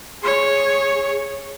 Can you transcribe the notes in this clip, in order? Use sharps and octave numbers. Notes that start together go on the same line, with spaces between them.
G#4 C#5